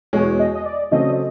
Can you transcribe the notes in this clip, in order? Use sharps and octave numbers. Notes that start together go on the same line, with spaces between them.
E2 B2 G#3 C#5
D#5
D#5
D5
C#3 F#3 A3 C4 D#5